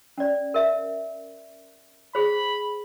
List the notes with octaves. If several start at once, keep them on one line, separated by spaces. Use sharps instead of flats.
C#4 D5
A#4 E5
G#4 C5 B5